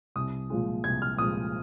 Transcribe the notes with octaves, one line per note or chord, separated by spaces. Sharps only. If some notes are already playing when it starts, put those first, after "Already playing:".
C2 D#6
A#2 F3 G#3
C2 G#6
F6
A#2 F3 G#3 D#6